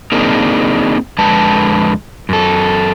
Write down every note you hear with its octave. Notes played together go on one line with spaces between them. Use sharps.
A#3 C4 D4 D#4 G#4 A#4
F2 D3 G#3 B4 A5
F#2 A4